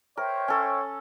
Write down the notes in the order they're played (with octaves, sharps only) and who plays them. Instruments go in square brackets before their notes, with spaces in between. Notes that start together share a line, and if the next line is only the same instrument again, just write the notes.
[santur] A#4 [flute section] C5 E5 G5 [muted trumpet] C#5
[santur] C#4 A4